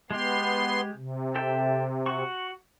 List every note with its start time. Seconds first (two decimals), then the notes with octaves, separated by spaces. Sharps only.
0.11 G#3 B3 G4 C6
0.95 C3
1.35 A4 E5 G5
2.06 F#4 C#6